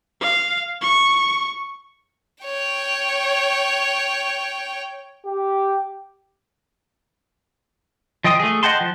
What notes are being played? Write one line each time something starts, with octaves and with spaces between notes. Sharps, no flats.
F5
C#6
C#5 G5
G4
F3 D#5 G5 C6 D#6
A3 G#4
D#5 F#5 G5 A5 C6
F3